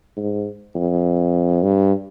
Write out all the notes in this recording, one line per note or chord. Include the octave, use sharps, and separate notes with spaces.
G#2
F2
G2